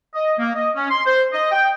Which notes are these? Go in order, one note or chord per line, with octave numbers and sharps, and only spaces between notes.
D#5
A#3
D#5
C#4
C6
C5
D#5
G5